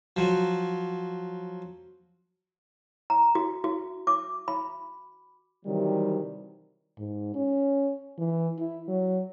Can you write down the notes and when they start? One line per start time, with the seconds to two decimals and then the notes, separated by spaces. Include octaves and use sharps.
0.16 F3 F#3
3.10 A#5
3.35 F#4
3.64 F#4
4.07 D6
4.48 B5
5.65 C3 D#3 E3 F#3 G3
6.98 G#2
7.35 C#4
8.18 E3
8.59 E4
8.88 F#3